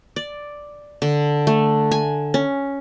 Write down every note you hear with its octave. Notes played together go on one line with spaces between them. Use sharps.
D5
D3
A3
G#5
C#4